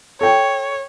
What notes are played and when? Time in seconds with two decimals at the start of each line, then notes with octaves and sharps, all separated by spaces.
0.21 A4 C#5 G5